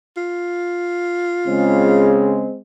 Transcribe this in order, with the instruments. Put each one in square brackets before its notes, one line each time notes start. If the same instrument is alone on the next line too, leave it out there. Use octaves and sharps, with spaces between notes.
[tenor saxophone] F4
[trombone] C#3 [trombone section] G#3 C4